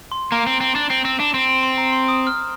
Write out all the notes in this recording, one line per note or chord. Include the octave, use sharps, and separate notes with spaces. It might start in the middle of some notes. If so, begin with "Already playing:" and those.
C6
A#3 A#5
C4
C4
D4
C4
C4
D4
C4
C6
C6
A#5
C6
D#6
F6